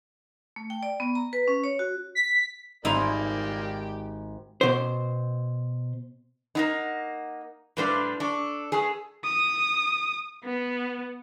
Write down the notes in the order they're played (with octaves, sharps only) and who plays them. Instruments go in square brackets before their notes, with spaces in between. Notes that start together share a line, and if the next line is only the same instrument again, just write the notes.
[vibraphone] A3
G5
D5
B3
A#5
B4
C#4
C#5
F#4
[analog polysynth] B6
[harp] G#1 [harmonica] A#3 D5 [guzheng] D#4 E4 C5 [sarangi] G4
[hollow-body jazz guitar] B2 C5
[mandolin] A#3 B3 F#5 [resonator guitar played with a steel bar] D#4
[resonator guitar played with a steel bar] A2 G3 D4 [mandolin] B4 C5 F5
[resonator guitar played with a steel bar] D4 [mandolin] A4 C#6
[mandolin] A3 B4 [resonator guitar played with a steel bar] G#4
[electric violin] D#6
B3